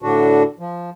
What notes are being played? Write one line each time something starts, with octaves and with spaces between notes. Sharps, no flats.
A2 D3 D4 F#4
F3